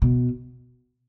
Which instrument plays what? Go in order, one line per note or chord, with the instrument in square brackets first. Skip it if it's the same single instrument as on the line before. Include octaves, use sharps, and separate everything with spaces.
[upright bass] B2